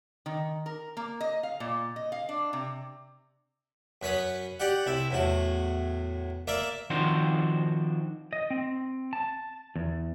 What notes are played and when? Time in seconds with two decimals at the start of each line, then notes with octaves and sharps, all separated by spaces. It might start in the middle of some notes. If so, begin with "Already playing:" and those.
0.26 D#3
0.66 A#4
0.97 A#3
1.21 D#5
1.43 F5
1.60 A#2
1.96 D#5
2.12 F5
2.29 D4
2.53 C3
4.02 F#2 B4 C#5 D#6
4.60 G4 D5 F#5
4.86 C2 E4
5.11 E2 A2 F#4
6.48 A#3 A#4 D5 E5
6.90 D#3 F3 C4 D4 F#4 C5
8.33 D#5
8.50 C4
9.13 A5
9.76 E2